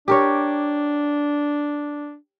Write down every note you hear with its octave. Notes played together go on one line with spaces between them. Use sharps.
D4 G4 A#4 C#5